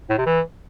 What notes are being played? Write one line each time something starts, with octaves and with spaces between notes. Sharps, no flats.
A2
C3
E3